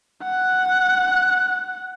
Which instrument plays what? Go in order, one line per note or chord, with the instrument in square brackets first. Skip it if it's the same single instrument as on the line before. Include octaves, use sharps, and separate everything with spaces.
[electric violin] F#5 F#6